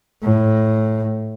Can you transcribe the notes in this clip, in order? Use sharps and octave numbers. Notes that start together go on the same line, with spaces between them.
A2